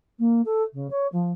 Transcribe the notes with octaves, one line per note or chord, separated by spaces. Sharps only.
A#3
A4
C#3
C#5
F3